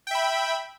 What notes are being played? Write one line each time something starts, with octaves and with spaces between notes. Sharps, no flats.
E5 G5 B5